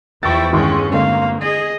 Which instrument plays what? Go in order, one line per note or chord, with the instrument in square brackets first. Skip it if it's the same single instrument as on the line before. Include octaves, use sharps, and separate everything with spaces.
[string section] E2 F3 E4 [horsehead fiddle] G5 [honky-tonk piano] C#6 E6 A6
[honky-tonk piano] G1 C6 C#6 [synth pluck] D#3 E4 [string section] G#3 C#4
[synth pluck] D3 G#3 C4 [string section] A#3 [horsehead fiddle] F5
[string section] G#4 [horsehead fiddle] D#5